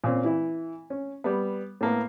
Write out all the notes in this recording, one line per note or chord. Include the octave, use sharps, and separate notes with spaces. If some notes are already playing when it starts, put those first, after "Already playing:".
A#2 C4 C#4
E3 E4
C#4
G3 B3
A2 A#3 B3